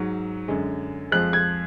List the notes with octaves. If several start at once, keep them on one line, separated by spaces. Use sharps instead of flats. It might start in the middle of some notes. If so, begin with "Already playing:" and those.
Already playing: G#2 F#3
F#2 D3 G#3
F2 F3 G#3 F#6
G#6